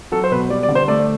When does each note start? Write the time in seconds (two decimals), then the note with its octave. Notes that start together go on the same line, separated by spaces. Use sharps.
0.12 F#3 A4
0.24 C5
0.31 B2 B4
0.50 G3 D5
0.63 D5
0.69 D3
0.75 C5
0.88 A3 D5